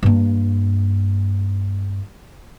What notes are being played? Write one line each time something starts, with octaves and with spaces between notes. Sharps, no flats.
G2 A#3